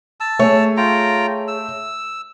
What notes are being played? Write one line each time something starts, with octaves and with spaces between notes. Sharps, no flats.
A5 E6
A3 G#4 C#5
F4 G5 A#5
E6